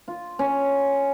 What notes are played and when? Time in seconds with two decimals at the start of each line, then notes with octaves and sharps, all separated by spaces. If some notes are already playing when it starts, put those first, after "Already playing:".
0.08 F4
0.39 C#4